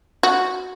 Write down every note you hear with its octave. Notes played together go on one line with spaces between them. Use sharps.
F#4